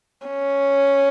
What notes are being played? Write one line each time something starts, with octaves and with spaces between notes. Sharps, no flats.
C#4